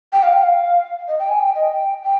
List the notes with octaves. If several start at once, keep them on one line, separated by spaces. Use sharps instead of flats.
G5
F5
G5
F5
D#5
G5
G#5
G5
D#5
G5
G5